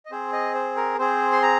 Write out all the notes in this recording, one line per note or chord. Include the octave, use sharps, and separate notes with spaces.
D#5
C4 G#4 C5
D#5
C5
A#4
C4 G#4 C5
C6
A#5